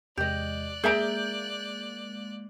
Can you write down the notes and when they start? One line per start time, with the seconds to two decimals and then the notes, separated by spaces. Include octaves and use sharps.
0.18 E2 C3 G#3 G4 D5 D#5 F#6
0.84 G#3 A#3 G#4 E5 A#5 G6 D7